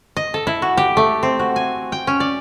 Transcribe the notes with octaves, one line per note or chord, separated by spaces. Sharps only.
D#5
A4
E4
F#4
G4
A3
C4
F#4
G#5
G5
C#4
D5